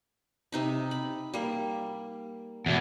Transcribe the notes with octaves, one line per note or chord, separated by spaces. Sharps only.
C3 D#4 B5
B5
G3 A#3
E2 B2